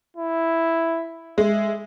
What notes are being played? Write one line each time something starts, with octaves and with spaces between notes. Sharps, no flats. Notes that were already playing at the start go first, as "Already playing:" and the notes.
E4
G#3 E5